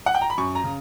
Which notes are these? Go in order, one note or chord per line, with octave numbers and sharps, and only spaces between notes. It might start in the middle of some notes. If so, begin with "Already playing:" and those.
F#5
G5
A#5
B5
F#2 C#6
A#5
C#3